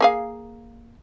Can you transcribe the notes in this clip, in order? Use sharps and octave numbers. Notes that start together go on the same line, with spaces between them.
A#3 G#4 F5